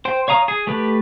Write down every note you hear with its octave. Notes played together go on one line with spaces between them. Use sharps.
C5 G5
C#5 F5 A#5 D#6
G#4
A3 G4 B4